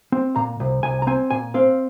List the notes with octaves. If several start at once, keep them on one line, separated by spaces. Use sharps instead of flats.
C4
A#2 A#5
C2
C2 G#5
A#5
C4 G#5
A#2 G#5
C4 F5